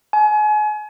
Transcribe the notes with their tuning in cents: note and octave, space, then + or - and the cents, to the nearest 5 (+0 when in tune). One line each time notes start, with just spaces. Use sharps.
G#5 +35